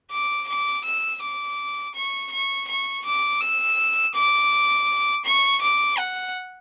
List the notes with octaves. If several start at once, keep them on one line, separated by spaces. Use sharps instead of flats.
D6
D6
E6
D6
C#6
C#6
C#6
D6
E6
D6
C#6
D6
F#5